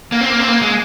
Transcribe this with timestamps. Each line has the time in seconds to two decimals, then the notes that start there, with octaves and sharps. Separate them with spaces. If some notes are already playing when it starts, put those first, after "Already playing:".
0.12 A#3
0.21 C4
0.30 A#3
0.39 C4
0.49 A#3
0.62 G#3